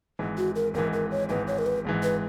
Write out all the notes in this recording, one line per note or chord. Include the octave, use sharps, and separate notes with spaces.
G#1 G#2 E3
F#4
A#4
G#1 G#2 E3 A#4
A#4
C#5
G#1 G#2 E3 B4
C#5
A#4
B4
G#1 G#2 E3
B4